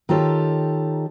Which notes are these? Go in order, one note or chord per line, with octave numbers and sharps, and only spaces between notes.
D#3 D#4 F4 G4 A4 C#5